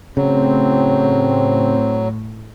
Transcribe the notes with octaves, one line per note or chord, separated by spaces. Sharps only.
A2 C#3 F#3 C4